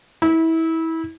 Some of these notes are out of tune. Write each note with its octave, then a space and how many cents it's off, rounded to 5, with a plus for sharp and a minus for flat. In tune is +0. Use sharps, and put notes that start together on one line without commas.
E4 -25